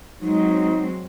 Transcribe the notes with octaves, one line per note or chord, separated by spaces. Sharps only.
F#3 G#3 C4 D#4